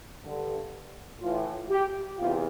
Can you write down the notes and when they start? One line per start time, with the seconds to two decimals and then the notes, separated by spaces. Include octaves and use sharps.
0.25 G2 D3
1.21 A2 E3 F4
1.70 G4
2.18 E2 C3 F4